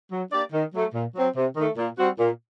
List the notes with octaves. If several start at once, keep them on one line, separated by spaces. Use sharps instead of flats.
F#3
A#3 D4 G4 D5
D#3
F#3 A3
A#2
F#3 C4
C3
D#3 A3
A#2
G3 C4 F#4
A#2